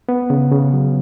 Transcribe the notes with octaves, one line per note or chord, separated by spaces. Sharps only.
B3
C#3
C#3
F#3